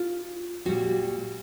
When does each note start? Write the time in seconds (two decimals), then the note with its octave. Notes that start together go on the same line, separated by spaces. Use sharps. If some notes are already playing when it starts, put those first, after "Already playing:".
Already playing: F4
0.65 A#2 G3 F#4